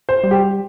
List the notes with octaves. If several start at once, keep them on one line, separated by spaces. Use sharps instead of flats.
C5
G3
G4